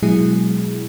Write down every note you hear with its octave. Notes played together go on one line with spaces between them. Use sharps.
B2 F#3 G#3 E4 G#4